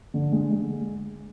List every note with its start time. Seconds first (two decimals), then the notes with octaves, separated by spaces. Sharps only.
0.14 D3
0.32 G#3
0.51 G#3